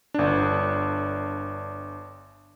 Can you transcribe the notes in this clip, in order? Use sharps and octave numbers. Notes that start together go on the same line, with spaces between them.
G1 D4